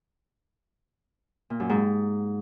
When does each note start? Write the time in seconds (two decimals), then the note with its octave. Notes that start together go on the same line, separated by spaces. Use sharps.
1.50 A#2
1.60 F#2
1.69 G#2